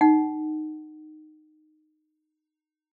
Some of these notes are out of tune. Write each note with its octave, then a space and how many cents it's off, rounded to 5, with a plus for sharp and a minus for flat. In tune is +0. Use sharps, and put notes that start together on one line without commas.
D#4 -15 F#5 +25